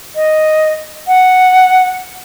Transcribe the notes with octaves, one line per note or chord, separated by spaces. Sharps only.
D#5
F#5